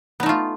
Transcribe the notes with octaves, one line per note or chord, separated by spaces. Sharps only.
A3 B3 D#4 F4